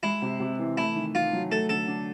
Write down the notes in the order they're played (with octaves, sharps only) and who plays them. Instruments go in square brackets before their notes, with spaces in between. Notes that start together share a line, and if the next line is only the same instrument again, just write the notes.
[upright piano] G#3 [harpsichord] E4
[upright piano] C3
C3
E3
[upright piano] A3 [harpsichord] E4
[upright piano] D#3
[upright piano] D#3 [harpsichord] F4
[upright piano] F#3
[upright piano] A3 [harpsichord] A4
[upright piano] D3 [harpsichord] A4
[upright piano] D4